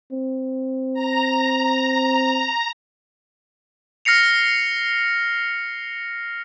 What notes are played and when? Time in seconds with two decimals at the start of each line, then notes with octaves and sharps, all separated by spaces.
0.13 C4
0.94 A#5
4.05 F6 A#6 C7 C#7 F7